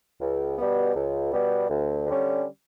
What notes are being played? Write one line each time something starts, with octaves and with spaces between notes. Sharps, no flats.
C#2
B2 G3 B3
C#2
B2 G3 B3
D2
D3 G3 C#4